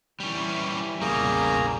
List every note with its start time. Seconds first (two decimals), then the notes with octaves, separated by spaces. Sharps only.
0.20 E3 G3 C#4
1.01 A#1 E2 C#3 G3 A#3 G#4 A#5